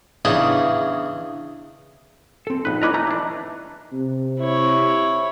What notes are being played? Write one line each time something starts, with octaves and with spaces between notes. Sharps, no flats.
E2 C#3 D4 D#4 C#5 F#5
C4 A4
A#1 D#4 B4
C#4 E4 B4 D#5 A#5 D6
A3 A#5
E3 D4
C3
E4 C#5